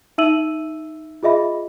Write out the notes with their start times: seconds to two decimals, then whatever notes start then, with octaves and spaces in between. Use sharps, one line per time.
0.18 D#4 E5 E6 D#7 F#7
1.23 F4 G#4 D#5 E5 B5